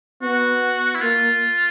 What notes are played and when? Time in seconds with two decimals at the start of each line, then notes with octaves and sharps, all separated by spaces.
0.22 B3 F#4
0.95 E4
1.01 A#3 F4